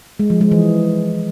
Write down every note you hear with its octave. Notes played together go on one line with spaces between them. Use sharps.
G#3
F3
G#3
E3